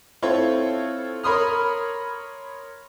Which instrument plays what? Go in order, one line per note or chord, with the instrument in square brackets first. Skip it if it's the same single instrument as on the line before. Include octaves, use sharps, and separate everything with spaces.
[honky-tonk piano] C4 E4 F4 A4 C#5
A#4 C#5 B5 C6 D#6 F6